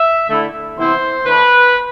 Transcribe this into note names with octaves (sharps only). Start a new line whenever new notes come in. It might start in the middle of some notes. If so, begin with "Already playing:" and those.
Already playing: E5
D3 A3 E4
C3 E3 B3 E4 C5
D3 A3 D4 B4